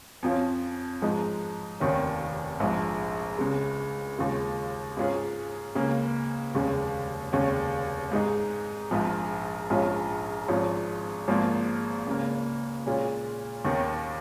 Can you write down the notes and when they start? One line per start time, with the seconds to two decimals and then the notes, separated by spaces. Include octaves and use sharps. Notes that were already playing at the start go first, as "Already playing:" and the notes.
0.23 F2 F3 C#4 F4
1.02 G#2 F3 G#3 D#4
1.80 F1 D#2 D#3 C#4
2.60 A#1 G#2 F3
3.38 C#2 C#3 G#3
4.18 D#2 C#3 G#3 F4
4.97 G#2 G#3 C#4 F4 G#4
5.75 C#2 C#3 A#3 C#4
6.54 F1 D#2 C#3 G#3
7.33 F1 D#2 C#3 G#3 C#4
8.12 G#2 G#3 D#4 G#4
8.91 A#1 G#2 F3
9.70 A#1 G#2 F3 C#4 F4
10.48 G#1 G#2 F3 C#4 F4
11.28 G#1 G#2 F3 A#3 F4
12.06 C#2 C#3 A#3
12.86 A#2 G#3 C#4 F4
13.65 D#2 D#3 C#4